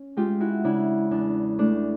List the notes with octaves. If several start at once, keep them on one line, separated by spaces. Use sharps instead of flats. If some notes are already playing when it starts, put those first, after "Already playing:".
Already playing: C#4
G#3 F4 G4
E4 F#4
C#3 D4 E4
E2 D4
A3 D4